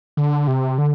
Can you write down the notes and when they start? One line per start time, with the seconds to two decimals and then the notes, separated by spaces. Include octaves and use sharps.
0.17 D3
0.47 C3
0.78 D3